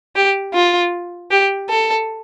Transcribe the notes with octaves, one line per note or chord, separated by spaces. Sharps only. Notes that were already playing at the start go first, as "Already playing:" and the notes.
G4
F4
G4
A4